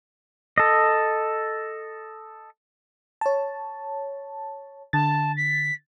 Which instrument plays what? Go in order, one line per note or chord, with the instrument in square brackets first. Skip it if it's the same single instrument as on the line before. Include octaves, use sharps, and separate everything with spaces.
[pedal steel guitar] A4 D#5
[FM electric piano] C#5 A5
[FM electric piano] D3 A6 [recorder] A5
[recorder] B6